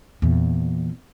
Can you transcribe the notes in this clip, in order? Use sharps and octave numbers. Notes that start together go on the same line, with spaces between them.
E2 A#2